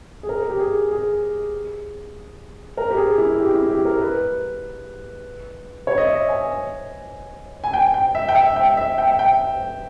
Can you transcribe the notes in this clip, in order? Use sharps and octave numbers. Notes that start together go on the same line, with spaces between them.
G#4
A#4
G4
G#4
G#4
A#4
G4
G#4
E4
G4
E4
G4
A#4
B4
C#5
D#5
E5
G#5
G#5
G5
G5
E5
G5
E5
G5
E5
G5
E5
G5